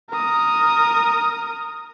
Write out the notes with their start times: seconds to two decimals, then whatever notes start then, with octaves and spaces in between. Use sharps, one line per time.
0.11 A#4 D#6